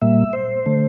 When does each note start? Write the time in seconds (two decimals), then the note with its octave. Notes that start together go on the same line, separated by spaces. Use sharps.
0.02 A#2 G3 A#3 E5
0.33 C5
0.66 D3 A3